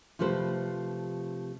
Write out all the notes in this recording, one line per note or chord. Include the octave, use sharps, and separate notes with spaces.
C3 F3 A3 G4 B4 C5